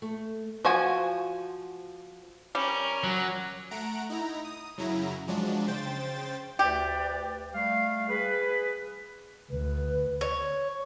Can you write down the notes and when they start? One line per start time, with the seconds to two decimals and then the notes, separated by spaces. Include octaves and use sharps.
0.02 A3
0.65 F3 F#4 G#5
2.55 G3 C#4 A#4
3.04 F#3
3.71 A3 F#5 A#5 D7
4.10 D#4 E4 A#5
4.45 D#6
4.78 F#2 C#3 F#3 E4 A#5
5.28 F3 F#3 G#3 D4
5.68 C#3 C5 G5 A6
6.59 D2 G4 B4 D5
7.55 G3 A3 F5
8.09 G#4 B4
9.51 D2 B4
10.21 C#5